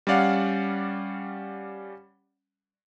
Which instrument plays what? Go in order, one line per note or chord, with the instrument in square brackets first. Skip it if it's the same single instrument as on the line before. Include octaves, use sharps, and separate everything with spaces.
[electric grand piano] G3 C#4 D5 F5 F#5